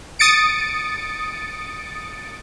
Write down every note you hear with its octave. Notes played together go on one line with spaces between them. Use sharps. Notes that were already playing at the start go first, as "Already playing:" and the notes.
D#6 A6 C#7 D7